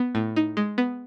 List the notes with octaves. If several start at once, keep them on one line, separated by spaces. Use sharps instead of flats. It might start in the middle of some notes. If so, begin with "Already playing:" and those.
Already playing: B3
A2
D#4
G#3
B3